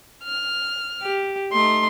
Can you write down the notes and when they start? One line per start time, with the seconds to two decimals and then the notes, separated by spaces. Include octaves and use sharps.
0.24 F6
1.02 G4
1.52 A3 D#4 C6